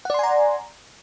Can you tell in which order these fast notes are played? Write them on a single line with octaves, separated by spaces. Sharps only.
F#5 D5 C6 G#5 A#5